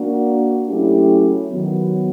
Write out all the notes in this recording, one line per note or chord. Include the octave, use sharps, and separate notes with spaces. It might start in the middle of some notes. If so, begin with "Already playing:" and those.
Already playing: A#3 D4 F#4
F#3 A3 C#4 E4 G4
D#3 F#3 B3